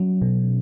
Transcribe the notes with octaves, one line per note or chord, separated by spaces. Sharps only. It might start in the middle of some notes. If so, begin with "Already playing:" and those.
Already playing: F#3 C#4
B2